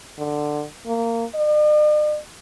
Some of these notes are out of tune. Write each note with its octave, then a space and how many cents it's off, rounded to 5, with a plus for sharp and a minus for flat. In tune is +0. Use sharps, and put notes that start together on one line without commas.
D3 +15
A#3 -20
D5 +45